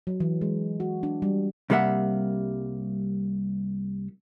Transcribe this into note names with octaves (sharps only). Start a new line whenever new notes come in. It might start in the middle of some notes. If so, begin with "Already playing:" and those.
F#3
E3
G#3
F#4
D4
G3
C2 C3 G3 A#3 E5 F#5